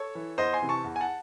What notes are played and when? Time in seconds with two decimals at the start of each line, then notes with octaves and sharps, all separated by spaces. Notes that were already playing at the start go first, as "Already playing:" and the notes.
Already playing: A4 C#5
0.15 E3
0.38 E2 C5 D#5
0.53 G#5 C6
0.62 C3 E3
0.69 A5 C#6
0.84 E2
0.96 G#5
1.01 F#5 A5